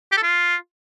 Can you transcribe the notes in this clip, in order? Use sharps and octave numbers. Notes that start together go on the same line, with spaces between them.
G4
A4
F4